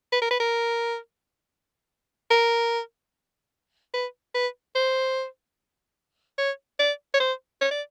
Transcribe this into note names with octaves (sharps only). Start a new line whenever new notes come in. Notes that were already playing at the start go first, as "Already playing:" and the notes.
B4
A#4
B4
A#4
A#4
B4
B4
C5
C#5
D5
C#5
C5
C#5
D5